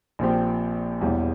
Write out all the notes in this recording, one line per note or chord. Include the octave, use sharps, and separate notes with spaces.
A#1 A#2 F3 C4 G4
E1 E2 E3 G3